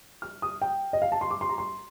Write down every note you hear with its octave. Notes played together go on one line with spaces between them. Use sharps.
F6
D#6
G5
D#5
F5
A5
C6
D6
C6
A#5
C6